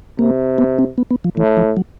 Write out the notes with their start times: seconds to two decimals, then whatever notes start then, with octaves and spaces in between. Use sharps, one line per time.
0.19 C3 A#3
0.58 B3
0.79 C4
0.98 B3
1.11 B3
1.24 F3
1.37 A2 E3
1.57 F3
1.77 F#3